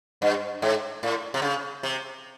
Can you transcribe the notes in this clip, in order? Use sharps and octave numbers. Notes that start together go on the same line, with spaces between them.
G2
G#2
A2
C3
C#3
C3